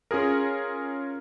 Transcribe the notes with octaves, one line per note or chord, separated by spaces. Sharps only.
C#4 F4 G#4 A#4